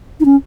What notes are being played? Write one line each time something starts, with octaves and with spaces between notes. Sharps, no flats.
D#4
C#4